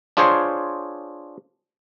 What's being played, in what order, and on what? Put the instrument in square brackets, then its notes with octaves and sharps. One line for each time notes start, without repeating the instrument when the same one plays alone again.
[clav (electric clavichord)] D4 F4 G#4 C5 C#5